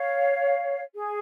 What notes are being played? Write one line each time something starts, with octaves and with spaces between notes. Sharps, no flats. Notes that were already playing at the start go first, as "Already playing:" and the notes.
Already playing: C#5 F5
G#4